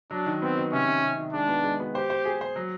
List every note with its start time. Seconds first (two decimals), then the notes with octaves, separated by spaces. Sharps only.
0.11 F#3 D4
0.26 D#3
0.42 B3 C4
0.57 D#3
0.72 C3 C#4
0.87 C3
1.03 C3
1.18 D#3
1.33 G#3 D4
1.48 B3
1.64 G#3
1.80 B3
1.95 G4 C5
2.10 C5
2.25 G#4
2.41 C5
2.56 F#3